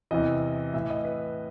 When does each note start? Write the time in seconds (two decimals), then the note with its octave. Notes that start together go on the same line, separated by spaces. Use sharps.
0.11 E2 C3 E3 D#5
0.74 A2 E3 E5
0.90 D#5
1.05 B4